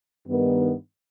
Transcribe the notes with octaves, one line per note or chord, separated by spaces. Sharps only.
G2 D#3 B3